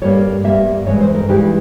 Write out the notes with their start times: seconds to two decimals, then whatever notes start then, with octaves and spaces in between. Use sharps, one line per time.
0.02 G2 G3 A#3 C#5
0.44 G2 G3 A#3 E5
0.86 G2 E3 G#3 C#5
1.00 C5
1.15 A#4
1.29 G2 E3 G#3 G4